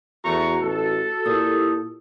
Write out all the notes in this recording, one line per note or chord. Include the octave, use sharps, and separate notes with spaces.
E2 A3 F#4 A#5 C#6
A1 A4
A#2 E4 G4 D#6